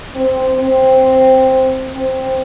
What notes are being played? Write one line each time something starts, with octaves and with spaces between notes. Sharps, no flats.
C4
C4
C4